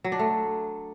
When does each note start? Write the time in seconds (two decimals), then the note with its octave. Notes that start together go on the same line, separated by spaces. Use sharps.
0.04 F#3
0.12 D4
0.19 A3